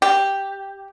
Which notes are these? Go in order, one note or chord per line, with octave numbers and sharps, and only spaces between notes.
G4